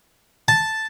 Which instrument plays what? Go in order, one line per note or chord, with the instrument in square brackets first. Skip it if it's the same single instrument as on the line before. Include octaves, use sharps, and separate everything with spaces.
[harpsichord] A5